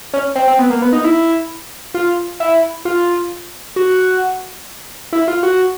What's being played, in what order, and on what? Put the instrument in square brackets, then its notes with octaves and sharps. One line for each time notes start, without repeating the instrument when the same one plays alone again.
[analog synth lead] C#4
C4
C4
B3
A#3
B3
D#4
E4
F4
E4
F4
F#4
E4
F4
F#4